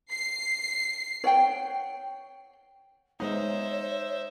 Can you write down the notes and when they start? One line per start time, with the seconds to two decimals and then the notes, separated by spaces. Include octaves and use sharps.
0.10 C7
1.24 C#5 F#5 G5
3.20 G#3 B3 D#4 C5 C#5 E5